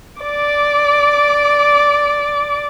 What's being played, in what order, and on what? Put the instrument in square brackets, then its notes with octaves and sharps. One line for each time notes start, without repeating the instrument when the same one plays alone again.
[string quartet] D5 D6